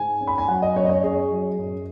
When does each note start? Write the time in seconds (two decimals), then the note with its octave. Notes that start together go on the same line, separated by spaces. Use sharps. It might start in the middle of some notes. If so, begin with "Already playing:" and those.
Already playing: G#2 G#5
0.21 C#4
0.27 B5
0.38 G#5
0.48 F#3 F#5
0.62 D#5
0.76 F#2 C#5
0.85 D#5
0.89 C#5
1.03 C#4 G#4
1.31 F#3
1.58 F#2